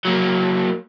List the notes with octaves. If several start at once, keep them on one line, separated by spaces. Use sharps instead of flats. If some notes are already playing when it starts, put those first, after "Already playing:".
F#3 A#3